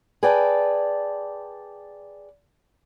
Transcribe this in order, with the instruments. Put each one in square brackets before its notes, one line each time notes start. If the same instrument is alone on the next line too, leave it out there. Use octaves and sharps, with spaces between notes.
[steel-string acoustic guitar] G#4 B4 D5 G5 A5